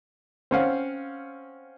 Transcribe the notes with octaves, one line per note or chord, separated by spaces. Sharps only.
C4 C#4 F5 F#5